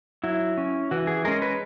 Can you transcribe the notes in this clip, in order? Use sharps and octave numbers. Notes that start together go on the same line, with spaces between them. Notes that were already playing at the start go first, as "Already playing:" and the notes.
F#3 E4
C#4
E3 F#4
G#4
G#3 C#4 A#4
B4